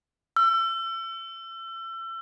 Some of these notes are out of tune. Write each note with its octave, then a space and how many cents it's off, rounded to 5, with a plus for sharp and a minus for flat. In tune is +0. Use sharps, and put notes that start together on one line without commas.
E6 +35